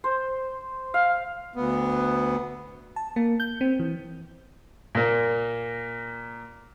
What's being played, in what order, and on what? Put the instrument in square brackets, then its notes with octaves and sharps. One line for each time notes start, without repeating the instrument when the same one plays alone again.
[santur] C5
F5
[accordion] D2 B3
[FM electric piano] A5
A#3
G6
C4
E3
[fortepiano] A#2 A#3